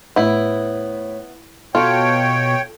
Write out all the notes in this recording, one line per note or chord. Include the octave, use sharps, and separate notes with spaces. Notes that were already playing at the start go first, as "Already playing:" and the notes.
A2 B3 E4
B2 F4 A4 C#5 G5